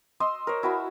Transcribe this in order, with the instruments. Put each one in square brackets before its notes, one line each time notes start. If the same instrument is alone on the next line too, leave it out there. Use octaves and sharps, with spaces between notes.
[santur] D#5 C6 E6
A#4 C5 C#5
E4 F#4 G#5 B5